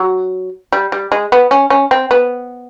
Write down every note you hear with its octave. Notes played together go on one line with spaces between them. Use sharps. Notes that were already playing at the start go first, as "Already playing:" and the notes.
Already playing: F#3
G3
G3
G#3
B3
C#4
C#4
C4
B3